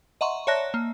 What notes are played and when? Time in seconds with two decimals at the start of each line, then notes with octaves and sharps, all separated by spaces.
0.21 D#5 E5 F#5 A#5 C6 C#6
0.47 C#5 D5 E5 A5 F#6 A#6
0.74 A#3